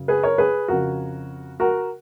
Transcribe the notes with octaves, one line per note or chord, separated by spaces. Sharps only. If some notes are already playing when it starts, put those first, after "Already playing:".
Already playing: F#2 C#3
G#4 B4
A#4 C#5
G#4 B4
F2 C#3 F#4 A#4
F#4 A#4